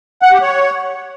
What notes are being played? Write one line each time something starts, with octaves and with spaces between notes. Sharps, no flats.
F#5
G4
C#5